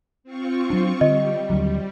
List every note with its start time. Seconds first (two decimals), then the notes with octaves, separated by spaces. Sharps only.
0.24 C4 F4 C#6
0.70 F#3 D4
1.01 D3 G3 D#5
1.50 D#2 D3 F#3